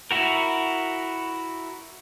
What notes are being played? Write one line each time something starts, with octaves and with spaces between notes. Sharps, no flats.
E4 F#4 A#4